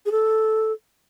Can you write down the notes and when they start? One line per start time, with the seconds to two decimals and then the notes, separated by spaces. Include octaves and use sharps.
0.06 G#4
0.12 A4